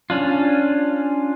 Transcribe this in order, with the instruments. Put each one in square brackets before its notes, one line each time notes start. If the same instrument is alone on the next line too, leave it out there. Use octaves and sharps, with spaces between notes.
[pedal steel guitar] C#4 D4 F4